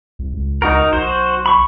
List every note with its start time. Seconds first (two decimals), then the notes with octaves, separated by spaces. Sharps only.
0.19 C2
0.34 C#2
0.62 C#2 D#4 F#4 A#4
0.93 B1 F#4 C5
1.46 B5 C#6